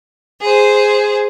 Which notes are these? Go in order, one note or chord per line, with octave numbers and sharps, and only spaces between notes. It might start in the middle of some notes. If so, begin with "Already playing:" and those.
G#4 C5